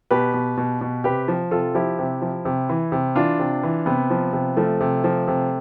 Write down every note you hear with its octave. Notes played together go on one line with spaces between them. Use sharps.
B2 G4 B4
B2
B2
B2
C3 G4 B4
F3
C3 F4 A4
F3 E4 G4
C3
F3
C3
E3
C3
E3 D4 F4
C3
E3
C3 B3
F3
C3
F3 A3
C3
F3
C3